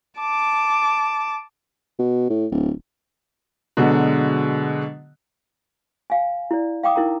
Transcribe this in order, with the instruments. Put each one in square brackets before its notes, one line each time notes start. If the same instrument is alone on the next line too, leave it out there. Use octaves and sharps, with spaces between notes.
[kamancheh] A5 D6
[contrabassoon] B2
A2
D1
[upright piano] B2 D3 F#3 G#3
[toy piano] F5 G#5
E4 D5
F5 G5 D6 D#6
D#4 E4 A#4 G5 A#5